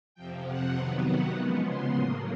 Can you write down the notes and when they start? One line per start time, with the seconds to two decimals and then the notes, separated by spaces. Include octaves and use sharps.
0.15 F2 C3 F3 G5
0.45 F#5
0.75 C3 D#3 F#3 B3 F5
1.05 F#5
1.34 C#3 F3 G#3 B3
1.64 C6
1.93 A2 F#3 A#3 D#6